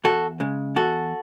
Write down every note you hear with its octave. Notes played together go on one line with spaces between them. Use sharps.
E2 F#4 A4
C#3 G#3
E2 F#4 A4